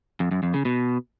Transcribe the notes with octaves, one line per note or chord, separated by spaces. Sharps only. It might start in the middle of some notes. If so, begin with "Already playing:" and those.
F2
F#2
F2
C#3
B2